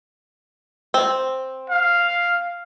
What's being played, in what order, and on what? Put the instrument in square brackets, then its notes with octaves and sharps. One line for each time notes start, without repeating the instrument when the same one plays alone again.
[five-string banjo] C4
[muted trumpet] F5